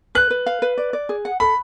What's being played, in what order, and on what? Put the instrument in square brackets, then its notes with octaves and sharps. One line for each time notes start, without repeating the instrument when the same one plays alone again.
[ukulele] B4 [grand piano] F#6
[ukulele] B4
F5
B4
D5
D5
G#4
F#5
[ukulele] A4 [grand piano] B5